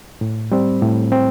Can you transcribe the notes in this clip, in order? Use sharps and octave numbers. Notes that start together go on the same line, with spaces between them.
A2
G3 C4
A2
C4